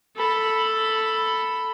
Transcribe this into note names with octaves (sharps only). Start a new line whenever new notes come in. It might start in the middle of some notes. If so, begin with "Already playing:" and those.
A4 B5